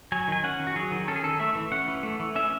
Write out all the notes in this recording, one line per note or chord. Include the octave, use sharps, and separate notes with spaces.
F#3 G#5
D#3 G#5
C#4 F#5
D#3
F#4
F#3 G#4
D#3
C#4 A4
G#4
D#3 A4
A3 E5
E3
C#4 F#5
E3
A3
E3
C#4 E5